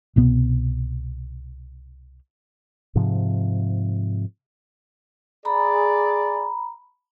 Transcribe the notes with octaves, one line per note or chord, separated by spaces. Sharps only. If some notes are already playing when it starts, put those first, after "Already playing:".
C2 B2 B3
G#2 C3 F3
G#4 D5 A#5 B5